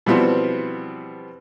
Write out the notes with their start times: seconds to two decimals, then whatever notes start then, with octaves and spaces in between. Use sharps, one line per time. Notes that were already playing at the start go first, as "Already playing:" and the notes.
0.06 B2 E3 F3 G3 B3 C4